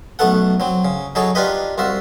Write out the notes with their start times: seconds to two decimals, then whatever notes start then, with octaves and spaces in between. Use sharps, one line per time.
0.19 B1 A3 B3 A4 F#5
0.60 F#3 C4
0.85 C#3
1.15 F#3 D#4 G#4 A4 C#5
1.35 D4 D#4 F4 G4 B4 D#5
1.78 C2 F4 F#4 E5